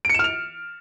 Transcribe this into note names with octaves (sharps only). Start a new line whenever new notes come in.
F6 C#7 D7 E7 F7